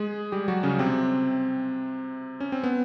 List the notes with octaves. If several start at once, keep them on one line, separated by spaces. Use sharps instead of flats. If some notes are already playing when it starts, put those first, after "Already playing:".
Already playing: G#3 G#4
G3 G4
F#3 F#4
C#3 C#4
C3 C4
C#4
C4
B3